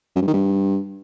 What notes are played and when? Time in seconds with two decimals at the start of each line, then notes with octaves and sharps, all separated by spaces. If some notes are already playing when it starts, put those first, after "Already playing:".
0.15 F#2
0.21 G2
0.27 D#3
0.33 G2